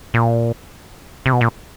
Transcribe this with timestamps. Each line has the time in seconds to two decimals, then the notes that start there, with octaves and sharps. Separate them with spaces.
0.14 A#2
1.26 C3
1.33 B2
1.41 A#2